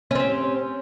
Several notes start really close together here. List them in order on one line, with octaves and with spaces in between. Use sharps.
C#4 C4 G4